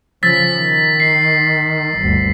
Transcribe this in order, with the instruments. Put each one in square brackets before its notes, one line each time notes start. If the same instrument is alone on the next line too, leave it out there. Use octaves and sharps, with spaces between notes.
[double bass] C#3 F3 [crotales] E6 A6 B6
[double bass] D#3
[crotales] C7
[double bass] G1 D2